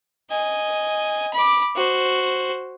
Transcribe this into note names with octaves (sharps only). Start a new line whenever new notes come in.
D#5 G#5
B5 D6
F#4 C5